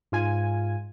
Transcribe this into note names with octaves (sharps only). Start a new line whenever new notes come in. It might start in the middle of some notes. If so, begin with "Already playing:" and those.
G#2 F4 G#5